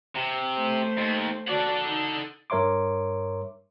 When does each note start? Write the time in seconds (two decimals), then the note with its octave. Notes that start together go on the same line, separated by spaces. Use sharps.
0.16 C3
0.55 A3 C5
0.97 D#2
1.47 F#4 A4 D5 F#5
1.82 D#4
2.50 G2 A#4 C#5 E5 C6 D6